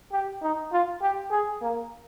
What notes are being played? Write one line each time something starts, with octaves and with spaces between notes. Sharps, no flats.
G4
D#4
F4
G4
G#4
A#3